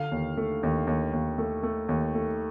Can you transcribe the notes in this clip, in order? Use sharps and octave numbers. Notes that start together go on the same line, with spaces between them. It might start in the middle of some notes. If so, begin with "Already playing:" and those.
Already playing: D3 F5
D#2
A3
D#2
D#2
D#2
A3
A3
D#2
A3